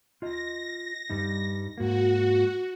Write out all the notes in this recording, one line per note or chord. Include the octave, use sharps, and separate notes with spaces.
F4 D#5 A#6
G2 G3 D#4
G#2 A#3 F#4